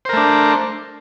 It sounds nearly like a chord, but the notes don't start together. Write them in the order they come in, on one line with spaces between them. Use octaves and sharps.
C5 A#4 A3 D4